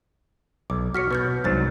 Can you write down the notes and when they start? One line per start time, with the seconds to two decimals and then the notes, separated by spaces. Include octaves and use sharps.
0.70 B1 D6
0.94 F#4 C#5 F6 B6 C#7
1.11 B2 B4 F6 G6
1.44 C2 G#2 F#3 C5 A6